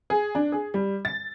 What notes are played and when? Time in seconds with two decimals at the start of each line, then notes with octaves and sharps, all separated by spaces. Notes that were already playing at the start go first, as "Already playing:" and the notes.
0.10 G#4
0.35 D4
0.52 G#4
0.74 G3
1.05 A6